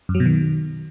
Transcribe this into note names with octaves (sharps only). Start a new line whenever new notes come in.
F#2
F#3
B2
D#3